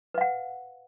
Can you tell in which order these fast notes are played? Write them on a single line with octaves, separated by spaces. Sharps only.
B4 F5 F#5